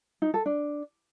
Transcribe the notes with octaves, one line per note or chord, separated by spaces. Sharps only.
D#4
A4
D4